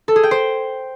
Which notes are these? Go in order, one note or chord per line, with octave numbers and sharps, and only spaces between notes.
A4
G#4
G5
C5